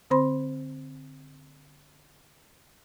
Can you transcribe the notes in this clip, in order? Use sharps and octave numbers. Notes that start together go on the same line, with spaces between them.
D3 C4 C5 B5 C6